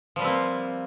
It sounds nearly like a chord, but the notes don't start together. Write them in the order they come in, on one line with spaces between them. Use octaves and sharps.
F3 G3 B4 C4 A#3